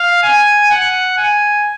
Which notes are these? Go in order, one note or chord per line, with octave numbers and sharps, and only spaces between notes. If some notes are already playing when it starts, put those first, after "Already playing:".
Already playing: F5
G#5
F#5
G#5